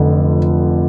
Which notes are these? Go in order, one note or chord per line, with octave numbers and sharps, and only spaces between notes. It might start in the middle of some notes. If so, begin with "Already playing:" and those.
Already playing: F1 F2 D3